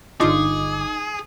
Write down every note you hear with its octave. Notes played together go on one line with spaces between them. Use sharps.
G1 D4 D#4 F4 G#4 D6